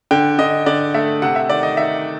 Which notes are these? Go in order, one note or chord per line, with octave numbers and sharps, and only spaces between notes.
D3 G5
D3 D#5
D3 D5
A3 E5
C3 F#5
E5
D#3 D5
D#5
D#3 E5